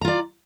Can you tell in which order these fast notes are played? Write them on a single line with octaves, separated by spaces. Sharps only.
A#5 F4 D5